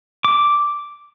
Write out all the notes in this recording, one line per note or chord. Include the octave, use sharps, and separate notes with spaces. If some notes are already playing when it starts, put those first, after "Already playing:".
D6